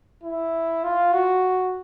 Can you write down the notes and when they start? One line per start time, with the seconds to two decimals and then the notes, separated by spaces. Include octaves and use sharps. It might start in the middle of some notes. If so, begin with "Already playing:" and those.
0.23 E4
0.83 F4
1.12 F#4